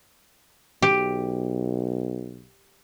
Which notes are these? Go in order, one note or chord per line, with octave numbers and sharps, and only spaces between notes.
B1 G4